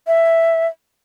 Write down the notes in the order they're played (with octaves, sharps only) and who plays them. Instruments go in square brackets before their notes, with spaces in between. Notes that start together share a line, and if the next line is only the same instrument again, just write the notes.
[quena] E5